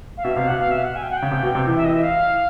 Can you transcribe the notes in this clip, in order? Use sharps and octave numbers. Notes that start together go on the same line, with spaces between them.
F5
B2 E5
C3 F5
B2 F#5
F5
E5
F#5
G#5
G5
F#5
G5
C#3
C3
B2
C3
E3
E5
D#5
E5
F5